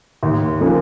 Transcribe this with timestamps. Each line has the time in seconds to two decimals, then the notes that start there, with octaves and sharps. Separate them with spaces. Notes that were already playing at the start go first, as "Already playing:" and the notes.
0.23 D#2
0.61 C#3 F3 A#3